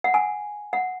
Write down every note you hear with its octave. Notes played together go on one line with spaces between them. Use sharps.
F#5
G#5
F#5